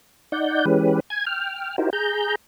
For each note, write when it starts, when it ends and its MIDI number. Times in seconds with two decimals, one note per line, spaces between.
0.32 0.65 63
0.32 0.65 74
0.32 0.65 78
0.32 0.65 91
0.65 1.00 52
0.65 1.00 56
0.65 1.00 61
0.65 1.00 67
0.65 1.00 71
1.10 1.25 80
1.10 1.25 92
1.27 1.76 79
1.27 1.76 89
1.78 1.90 63
1.78 1.90 64
1.78 1.90 66
1.78 1.90 67
1.78 1.90 70
1.78 1.90 72
1.93 2.35 68
1.93 2.35 82
1.93 2.35 91